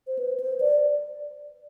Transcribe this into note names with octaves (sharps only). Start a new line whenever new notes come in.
C5
B4
C5
D5